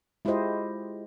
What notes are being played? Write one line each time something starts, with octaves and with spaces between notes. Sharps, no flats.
G#3 E4 F4 G4 C5 D#5